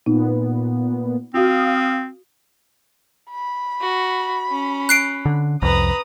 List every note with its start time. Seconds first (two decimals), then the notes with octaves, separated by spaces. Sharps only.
0.06 A#2 B3 D#4
1.34 C4 F4 F#4 F5 D#6
3.31 B5
3.81 F#4
4.48 C#4
4.89 F#6 C7 D7
5.26 D3
5.62 C2 F2 B4 A#5 D#6